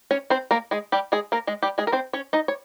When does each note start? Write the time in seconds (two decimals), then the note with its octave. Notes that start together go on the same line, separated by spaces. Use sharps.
0.11 C#4 C#5
0.30 C4 C5
0.51 A#3 A#4
0.71 G#3 G#4
0.92 G3 G4
1.12 G#3 G#4
1.32 A#3 A#4
1.47 G#3 G#4
1.63 G3 G4
1.78 G#3 G#4
1.87 A#4
1.92 C4 C5
2.13 C#4 C#5
2.33 D#4 D#5
2.48 C#5